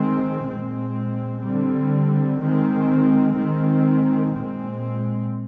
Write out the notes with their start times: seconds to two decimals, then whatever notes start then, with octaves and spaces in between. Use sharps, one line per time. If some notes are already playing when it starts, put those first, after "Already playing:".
Already playing: D#3 G#3 C4
0.48 A#2 G#3 C4
1.44 D3 G3 C4
2.41 D#3 G#3 C4
3.37 D#3 G#3 C4
4.34 A#2 G#3 C4